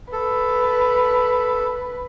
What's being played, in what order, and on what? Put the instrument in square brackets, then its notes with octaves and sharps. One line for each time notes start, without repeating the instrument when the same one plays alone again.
[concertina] A4 [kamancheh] B4